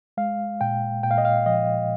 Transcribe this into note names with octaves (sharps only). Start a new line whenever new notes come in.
G#3 F5
A#2 G5
A#2 G5
F5
D#5
F5
F3 D#5